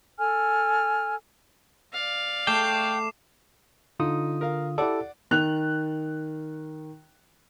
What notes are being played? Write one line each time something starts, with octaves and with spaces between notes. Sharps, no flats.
A4 G#5 F6
D5 F5
A3 G5 D6 C7 E7
D3 D#4 F4 D#6
A#4 F5
E4 G4 A4 D5 F#5 D6
D#3 F#6 F7